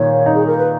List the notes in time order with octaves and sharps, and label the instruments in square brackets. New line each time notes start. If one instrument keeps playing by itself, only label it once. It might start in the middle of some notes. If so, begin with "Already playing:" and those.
Already playing: [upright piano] A#2 D#3 [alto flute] C#5
[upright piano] D#4
[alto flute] G#4
A#4
B4